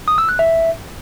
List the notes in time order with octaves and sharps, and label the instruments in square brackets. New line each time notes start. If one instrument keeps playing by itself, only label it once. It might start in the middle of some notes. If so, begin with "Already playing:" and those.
[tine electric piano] D#6
E6
F#6
E5